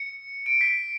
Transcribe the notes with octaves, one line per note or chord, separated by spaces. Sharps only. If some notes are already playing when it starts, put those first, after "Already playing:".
Already playing: C#7
D7
B6